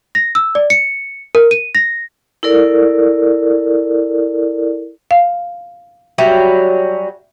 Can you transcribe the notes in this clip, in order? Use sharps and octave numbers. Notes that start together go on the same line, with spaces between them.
A#6
E6
D5
C#7
A#4
D#7
A#6
E4 A4 A#4 D5
F5
F#3 G3 C#4 E5